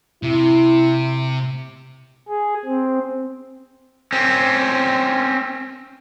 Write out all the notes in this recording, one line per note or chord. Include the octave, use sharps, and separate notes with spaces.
C3 E4
G#4
C4
C4 C#4